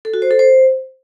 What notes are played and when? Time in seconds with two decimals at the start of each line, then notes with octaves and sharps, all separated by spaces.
0.05 A4
0.14 F#4
0.22 C5
0.31 A4
0.39 C5